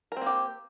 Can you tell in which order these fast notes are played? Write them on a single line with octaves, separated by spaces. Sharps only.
A#4 C4 A#3 G4